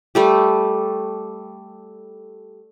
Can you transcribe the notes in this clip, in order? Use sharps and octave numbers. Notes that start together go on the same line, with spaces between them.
G3 A3 G4